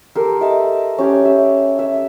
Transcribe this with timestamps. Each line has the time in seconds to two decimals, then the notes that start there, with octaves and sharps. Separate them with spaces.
0.15 G4 A4 A#4 C6
0.41 D#5 E5 A5
0.98 C#4 G4
1.25 E5
1.79 E5